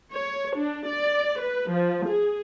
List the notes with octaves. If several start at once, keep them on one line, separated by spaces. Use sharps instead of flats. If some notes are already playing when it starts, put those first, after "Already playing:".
C#5
D4
D5
B4
F3
G#4